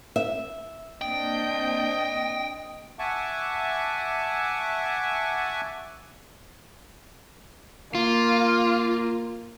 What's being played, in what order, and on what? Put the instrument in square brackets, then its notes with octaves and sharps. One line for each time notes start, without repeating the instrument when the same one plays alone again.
[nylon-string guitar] E5
[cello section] A#3 C4 D4 [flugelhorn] D#5 [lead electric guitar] G5
[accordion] E5 F#5 G#5 A5 C#6 D6
[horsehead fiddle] A#3 [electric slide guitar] F4